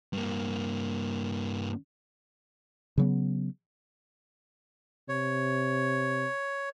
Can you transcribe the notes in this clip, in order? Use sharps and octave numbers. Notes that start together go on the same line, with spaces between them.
G2 A#3
C#3 F#3 B3
C3 C#5